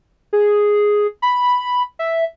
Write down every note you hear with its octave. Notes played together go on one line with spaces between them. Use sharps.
G#4
B5
E5